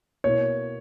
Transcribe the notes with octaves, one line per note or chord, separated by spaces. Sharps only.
B2 A#3 E4 C#5